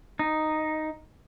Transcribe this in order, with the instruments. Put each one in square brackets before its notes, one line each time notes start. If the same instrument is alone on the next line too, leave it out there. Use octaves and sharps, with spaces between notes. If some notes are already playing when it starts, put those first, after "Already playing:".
[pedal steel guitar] D#4